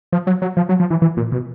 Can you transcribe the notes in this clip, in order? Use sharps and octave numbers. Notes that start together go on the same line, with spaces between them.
F3
F#3
F#3
F3
F#3
F3
E3
E3
A#2
B2